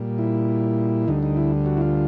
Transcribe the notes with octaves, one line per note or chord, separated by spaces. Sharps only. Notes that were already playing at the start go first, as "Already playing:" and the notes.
Already playing: A#2 G3
E4
D2 D3 G3 D#4
D#4
E4
F#4
E4
F4